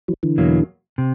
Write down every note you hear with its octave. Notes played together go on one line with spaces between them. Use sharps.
E3 F#3
D3 E3
E2 B2 F#3 A#3
C3